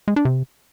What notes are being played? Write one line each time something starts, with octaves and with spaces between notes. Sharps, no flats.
G#3
D4
C3